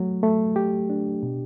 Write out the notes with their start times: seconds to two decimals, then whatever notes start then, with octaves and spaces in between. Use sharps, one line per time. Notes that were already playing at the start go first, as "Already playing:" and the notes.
Already playing: F#3 A3
0.23 A3
0.56 G4
0.90 D4
1.23 B2